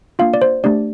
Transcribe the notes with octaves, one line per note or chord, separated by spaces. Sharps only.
A#3 D4 F4 F5
D5
C5
A3 D4 G4 D5